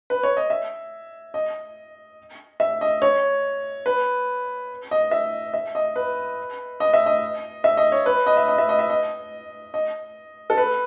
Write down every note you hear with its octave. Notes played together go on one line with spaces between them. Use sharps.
B4
C#5
D#5
E5
D#5
E5
D#5
C#5
B4
D#5
E5
E5
D#5
B4
D#5
E5
D#5
E5
D#5
C#5
B4
D#5
E5
D#5
E5
D#5
E5
D#5
D#5
A4
B4